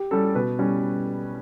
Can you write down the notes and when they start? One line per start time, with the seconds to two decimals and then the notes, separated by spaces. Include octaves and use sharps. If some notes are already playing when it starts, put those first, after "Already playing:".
Already playing: G4
0.11 G3 C#4 A4
0.35 B2 B4
0.59 G3 C#4